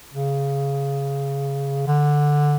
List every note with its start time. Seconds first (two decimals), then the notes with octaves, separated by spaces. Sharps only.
0.13 C#3
1.87 D3